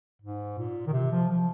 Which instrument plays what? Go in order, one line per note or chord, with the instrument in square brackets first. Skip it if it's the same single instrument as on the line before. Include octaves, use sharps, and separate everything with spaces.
[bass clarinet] G#2
A#2
D#3
C3
F3
F3